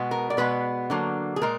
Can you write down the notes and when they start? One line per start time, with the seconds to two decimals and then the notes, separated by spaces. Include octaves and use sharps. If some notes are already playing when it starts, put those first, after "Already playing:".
Already playing: B2 G#3 B3
0.11 A#4
0.30 D5
0.37 B2 G#3 B3 B4
0.90 D3 F#3 A#3
1.36 G#4
1.41 A#2 G#3 A#4